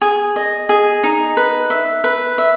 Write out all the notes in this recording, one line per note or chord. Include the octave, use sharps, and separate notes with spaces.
G#4
D#5
G#4
D#4
B4
E5
B4
E5